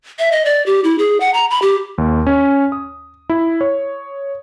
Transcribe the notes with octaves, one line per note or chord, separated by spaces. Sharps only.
E5
D#5
D5
G4
E4
G#4
F#5
A#5
B5
G4
D#2
C#4
D#6
E4
C#5